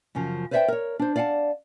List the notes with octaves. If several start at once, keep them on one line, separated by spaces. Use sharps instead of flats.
F#2 C#3 F3
B4 C5 D5 E5 F5 G5
A#4 C#5
D4 C5
D5 F5 F#5 G#5 A5